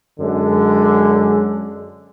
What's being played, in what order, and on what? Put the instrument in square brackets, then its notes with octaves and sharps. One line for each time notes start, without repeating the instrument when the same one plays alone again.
[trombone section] F#2 D3 G#3